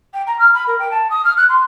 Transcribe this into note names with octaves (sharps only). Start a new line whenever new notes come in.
G5
A#5
F6
B5
A#4
G5
A5
D#6
F6
F#6
C6